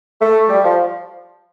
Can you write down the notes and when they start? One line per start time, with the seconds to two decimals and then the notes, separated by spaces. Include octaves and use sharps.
0.21 A3
0.49 G3
0.64 F3